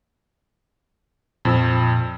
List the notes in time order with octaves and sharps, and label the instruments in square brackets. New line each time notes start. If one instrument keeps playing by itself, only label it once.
[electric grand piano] F2 F3 E6 [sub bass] A#2